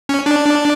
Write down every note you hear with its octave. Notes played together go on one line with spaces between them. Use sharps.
C#4
D4